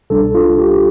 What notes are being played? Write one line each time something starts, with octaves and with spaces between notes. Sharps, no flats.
C2 B2 G3 D4 A4
F4
G4